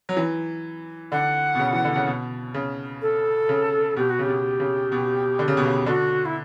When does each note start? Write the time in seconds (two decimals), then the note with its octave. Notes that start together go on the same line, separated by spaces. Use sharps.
0.09 F#3
0.17 E3
1.12 D3 F#5
1.55 B2
1.59 C#3
1.73 E3
1.85 D3
1.96 C#3
2.07 B2
2.54 C#3
3.01 A4
3.49 C#3
3.96 B2 G4
4.09 F#4
4.19 C#3 G4
4.28 B2
4.60 C#3
4.92 B2
5.39 D3
5.48 C#3
5.57 B2
5.66 C#3
5.86 D3 F#4
6.25 E4